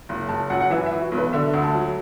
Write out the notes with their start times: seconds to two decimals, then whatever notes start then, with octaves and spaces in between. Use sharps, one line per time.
0.09 F#1
0.29 F#1 A5
0.50 F#2 F#5
0.60 F#5
0.70 E3 E5
0.86 E5
0.91 E3
1.01 F#4
1.12 B1
1.18 B4
1.33 D3 E5
1.54 D2
1.64 A5
1.74 F#3